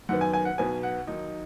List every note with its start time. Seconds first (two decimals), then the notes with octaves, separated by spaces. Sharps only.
0.09 F#2 D#3 B3 F#5
0.21 G#5
0.33 G#5
0.45 F#5
0.58 B1 B2 B3 G#5
0.83 F#5
1.07 D#2 D#3 F#3 D#4